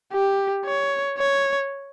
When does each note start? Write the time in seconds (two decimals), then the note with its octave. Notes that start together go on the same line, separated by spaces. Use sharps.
0.13 G4
0.66 C#5
1.18 C#5